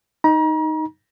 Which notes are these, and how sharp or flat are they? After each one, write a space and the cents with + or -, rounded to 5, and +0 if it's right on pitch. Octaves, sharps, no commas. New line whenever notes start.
D#4 +0 A#5 +40